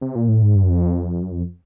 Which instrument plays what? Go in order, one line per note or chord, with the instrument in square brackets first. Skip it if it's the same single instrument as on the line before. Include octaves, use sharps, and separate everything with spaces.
[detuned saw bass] C3
A#2
A2
G#2
G2
F#2
F2
F#2
F2